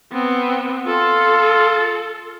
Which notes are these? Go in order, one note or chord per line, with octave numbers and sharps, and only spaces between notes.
B3 C4
F4 A4